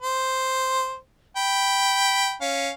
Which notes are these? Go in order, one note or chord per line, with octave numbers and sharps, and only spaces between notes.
C5
G5 B5
C#4 F5